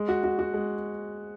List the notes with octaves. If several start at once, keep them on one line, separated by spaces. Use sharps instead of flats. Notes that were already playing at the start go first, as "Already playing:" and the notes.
Already playing: G#3
F#4
F#4
F#4
G#3